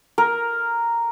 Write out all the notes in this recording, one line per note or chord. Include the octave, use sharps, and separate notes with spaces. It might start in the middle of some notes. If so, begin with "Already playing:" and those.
A#4